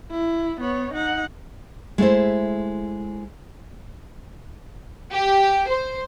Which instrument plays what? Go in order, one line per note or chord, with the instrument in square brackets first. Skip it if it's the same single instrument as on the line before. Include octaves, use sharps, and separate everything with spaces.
[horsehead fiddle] E4
B3 C#5
D#4 F#5
[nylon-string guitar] G#3 A3 E4 C5
[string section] G4
C5